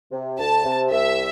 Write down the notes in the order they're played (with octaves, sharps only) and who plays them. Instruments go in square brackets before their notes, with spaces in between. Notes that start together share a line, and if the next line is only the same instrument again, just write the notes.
[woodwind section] C3
[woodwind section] D2 [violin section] A5
[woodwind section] C3
[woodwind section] C2 [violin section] E5